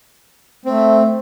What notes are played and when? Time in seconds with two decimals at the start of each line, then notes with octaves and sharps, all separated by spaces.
0.65 A3 C4